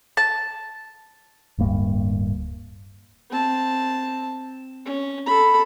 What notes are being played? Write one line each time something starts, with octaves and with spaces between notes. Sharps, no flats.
A5
D1 G2 A#3
C4 A5
C#4
A4 B5